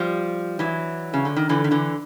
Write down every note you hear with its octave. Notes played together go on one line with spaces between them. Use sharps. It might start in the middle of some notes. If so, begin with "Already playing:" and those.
Already playing: F3 G3
E3 F#3
C#3
D3
D#3
D3 E3
D#3
D3 E3